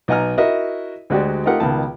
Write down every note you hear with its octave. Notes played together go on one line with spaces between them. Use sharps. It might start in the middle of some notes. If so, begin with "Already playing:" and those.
B1 D#5 F#5 G#5 A#5 F6
E4 F#4 A#4 D#5 E5
D2 G#3 F#4 G4 D5
A3 D#4 F4 G4 A#4 F#5
C#2 B2 D#3 A5